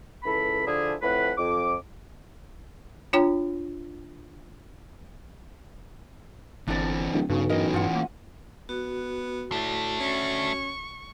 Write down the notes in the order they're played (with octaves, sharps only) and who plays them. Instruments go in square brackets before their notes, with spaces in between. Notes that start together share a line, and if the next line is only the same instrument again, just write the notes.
[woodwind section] C#2 E3 A4 B5
D3 F3 D4 E4 G#4
F2 A2 E3 B4 F#5 B5
F2 D6
[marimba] D4 F4 C#5 G5 A#5
[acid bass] G1 [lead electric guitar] E3 C4 [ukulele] D4 D5
[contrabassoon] D1
[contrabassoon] B1 [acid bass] G2 [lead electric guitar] C#3
[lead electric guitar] E3 C#4 [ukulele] A#4 D#5
[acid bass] G2 [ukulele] F4 F#5
[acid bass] A#3
[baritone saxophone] B3 [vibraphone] F#4
[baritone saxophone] A2 [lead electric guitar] A3 D4
[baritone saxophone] C#4 [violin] C#6